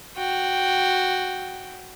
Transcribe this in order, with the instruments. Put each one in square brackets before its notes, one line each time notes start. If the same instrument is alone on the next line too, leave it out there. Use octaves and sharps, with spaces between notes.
[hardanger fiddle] F#4 G5